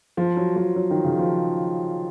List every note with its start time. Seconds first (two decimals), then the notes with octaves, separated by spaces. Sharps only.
0.17 F3
0.37 F#3
0.56 F3
0.76 F#3
0.91 D#3
1.04 C#3
1.19 F3